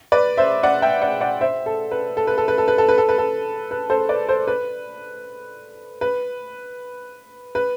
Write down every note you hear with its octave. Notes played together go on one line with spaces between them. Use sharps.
B4 D5
C5 E5
D5 F#5
E5 G5
D5 F#5
D5 F#5
C5 E5
A4
B4
A4
B4
A4
B4
A4
B4
A4
B4
A4
B4
A4
B4
A4 C5
B4 D5
A4 C5
B4
B4
B4